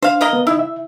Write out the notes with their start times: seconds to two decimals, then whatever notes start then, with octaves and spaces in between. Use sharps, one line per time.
0.02 D4 C5 F5
0.21 A#3 A#4 D#5
0.33 B3
0.47 D#4 E4 D#5
0.59 E5